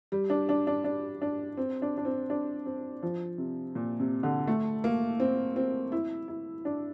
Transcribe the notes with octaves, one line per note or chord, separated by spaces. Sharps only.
G3
D4
D4
D4
D4
D4
C4
D4
D4
C4
D4
C4
F3
C3
A#2
C3
D3
A3
A#3
C4
C4
E4
E4
D4